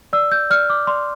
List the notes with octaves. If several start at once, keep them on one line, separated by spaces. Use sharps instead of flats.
D5 E6
G6
D5 F6
D6
D5 C6